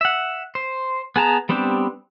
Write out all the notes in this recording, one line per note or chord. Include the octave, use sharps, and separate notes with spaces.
E5 F#5
C5
B3 G#4 A5 A#5
G3 B3 C4 D4 G4